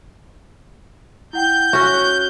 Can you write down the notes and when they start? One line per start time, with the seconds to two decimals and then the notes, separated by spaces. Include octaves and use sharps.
1.33 E4 F#5 G5 G6
1.73 C#4 F#4 F#6